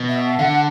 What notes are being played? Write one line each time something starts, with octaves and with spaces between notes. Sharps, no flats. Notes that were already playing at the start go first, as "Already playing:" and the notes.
Already playing: B2
E5
D3 F#5